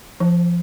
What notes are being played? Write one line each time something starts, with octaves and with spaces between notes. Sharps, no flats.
F3